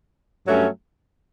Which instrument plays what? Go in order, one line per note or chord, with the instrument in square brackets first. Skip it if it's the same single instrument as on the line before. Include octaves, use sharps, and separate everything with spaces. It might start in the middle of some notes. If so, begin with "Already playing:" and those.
[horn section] G2 F#3 A3 C#4